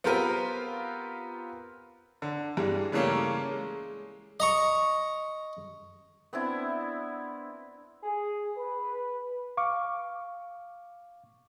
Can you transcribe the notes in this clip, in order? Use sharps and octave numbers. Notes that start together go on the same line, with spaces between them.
B3 C4 F4 G4 A#4 B4
D3
G2 E3 G3 G#3
C#3 E3 G3 A3 A#3 C#4
G#3
D#5 A#5 C#6
B3 C4 D4 E4
G#4
B4
F5 C#6 D6